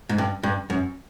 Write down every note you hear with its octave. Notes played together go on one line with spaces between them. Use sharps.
G#2
G2
G2
F#2